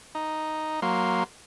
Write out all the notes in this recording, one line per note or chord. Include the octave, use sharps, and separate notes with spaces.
D#4
F#3 A#3 C6